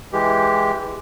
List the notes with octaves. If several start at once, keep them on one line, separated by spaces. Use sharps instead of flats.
E3 G#3 G4